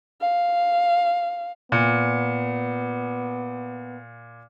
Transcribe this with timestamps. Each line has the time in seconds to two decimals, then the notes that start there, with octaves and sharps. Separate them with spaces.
0.21 F5
1.72 A#2 B3